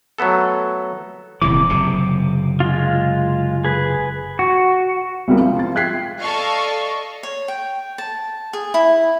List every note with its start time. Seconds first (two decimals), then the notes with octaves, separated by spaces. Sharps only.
0.18 F#3 A3 B3 A4
1.42 D#1 C3 E3 D6
1.69 F#1 C3
2.60 G#3 F4
3.64 G#4 B4
4.39 F#4
5.28 C2 C3 G3 G#3 A#3
5.40 F3
5.56 F4 A6
5.75 E5 G5 F#6 G#6 B6 C7
6.21 A4 D5 D#5 F5 C#6
7.23 C#5
7.48 G5
7.98 A5
8.53 G#4
8.74 E4